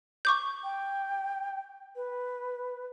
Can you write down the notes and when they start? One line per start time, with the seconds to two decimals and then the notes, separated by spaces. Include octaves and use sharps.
0.25 C#6 D6 G6
0.64 G5
1.96 B4